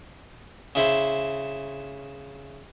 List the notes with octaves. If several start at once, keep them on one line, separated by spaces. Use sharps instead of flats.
C#3 E4 C5